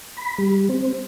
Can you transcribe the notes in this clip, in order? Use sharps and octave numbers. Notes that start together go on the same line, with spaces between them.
B5
G3
C4